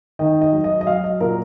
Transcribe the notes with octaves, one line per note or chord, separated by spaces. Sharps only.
D#3 D#5
D#5
F#3
D#5
D#5
F#3 F5
D#5
A#2 A#4